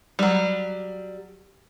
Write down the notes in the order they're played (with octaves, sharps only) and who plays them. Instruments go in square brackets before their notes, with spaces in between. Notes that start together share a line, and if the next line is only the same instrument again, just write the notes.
[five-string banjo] F#3 G3